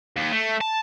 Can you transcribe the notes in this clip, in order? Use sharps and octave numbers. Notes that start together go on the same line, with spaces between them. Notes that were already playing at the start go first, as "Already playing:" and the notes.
D#2
A3
A5